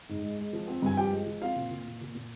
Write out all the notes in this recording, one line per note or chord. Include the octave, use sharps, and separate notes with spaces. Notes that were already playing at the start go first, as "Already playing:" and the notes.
G#2
G#3
G#3
F3
C4
G2 G#5
F3 G4 G5
G#3
F3
C4 F4 F5
A#2
A#2
A#2
A#2
A#2